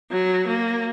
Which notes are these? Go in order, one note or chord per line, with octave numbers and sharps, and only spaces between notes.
F#3
A#3